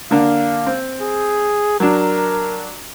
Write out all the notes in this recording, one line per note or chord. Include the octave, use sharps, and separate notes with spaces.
D3 A#3 D4 F5
C4
G#4
F#3 D4 A#4